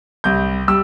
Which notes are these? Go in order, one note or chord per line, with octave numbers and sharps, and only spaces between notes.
C2 G6
G3 E6